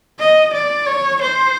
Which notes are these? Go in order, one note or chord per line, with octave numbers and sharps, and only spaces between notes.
D#5
D5
C#5
C5